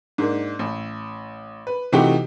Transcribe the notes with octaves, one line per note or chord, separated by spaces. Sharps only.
G#2 A#3 D4
A1
B4
C3 E3 A3 D#4 F#4 G4